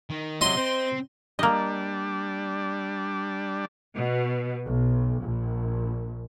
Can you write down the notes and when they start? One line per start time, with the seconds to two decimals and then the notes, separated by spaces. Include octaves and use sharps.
0.10 D#3
0.41 C3 F#3 D#5 C6
0.57 C4 C5
1.39 G3 A#3 D4 D#5
3.95 B2
4.67 B1
5.23 A#1